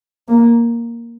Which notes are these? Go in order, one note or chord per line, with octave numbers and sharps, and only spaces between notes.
A#3